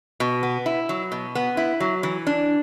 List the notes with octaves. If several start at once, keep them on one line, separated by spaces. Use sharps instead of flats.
B2
B3
E4
F#3
B2
B3
E4
F#3
E3
D4